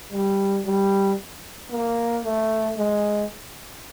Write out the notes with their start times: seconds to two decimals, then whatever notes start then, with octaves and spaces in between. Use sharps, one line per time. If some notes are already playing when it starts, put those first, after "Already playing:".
0.12 G3
0.65 G3
1.71 A#3
2.24 A3
2.77 G#3